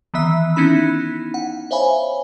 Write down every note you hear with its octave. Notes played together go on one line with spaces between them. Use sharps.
D#3 E3 B3 E5 E6
B3 C#4 D#4 E4 B5
F#5
C5 C#5 E5 F5 G#5 B5